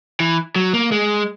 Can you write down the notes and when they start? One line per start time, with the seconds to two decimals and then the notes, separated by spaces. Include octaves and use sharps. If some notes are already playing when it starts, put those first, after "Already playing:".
0.20 E3
0.56 F#3
0.74 A#3
0.92 G#3